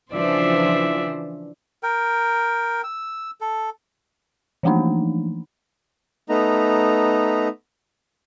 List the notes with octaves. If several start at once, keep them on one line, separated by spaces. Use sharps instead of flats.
C#3 E3 F3 D4 C5 D5 E5
A#4 G5
E6
A4
E3 F3 A3 A#3 D4 D#4
A3 B3 D#4 A#5